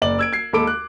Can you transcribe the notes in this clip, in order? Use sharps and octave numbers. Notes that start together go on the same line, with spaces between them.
F#1 D5 F#7
E6 G#6 D7
G#6 C7
D#2 G#3 A4 B5 D6 D7
F#6